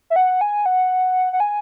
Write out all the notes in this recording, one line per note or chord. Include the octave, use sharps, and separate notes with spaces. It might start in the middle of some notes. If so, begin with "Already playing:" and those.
E5
F#5
G#5
F#5
F#5
G#5